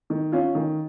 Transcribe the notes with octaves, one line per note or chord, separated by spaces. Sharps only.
D#3
C#4 F4
D#3